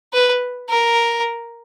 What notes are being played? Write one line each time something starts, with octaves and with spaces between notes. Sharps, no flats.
B4
A#4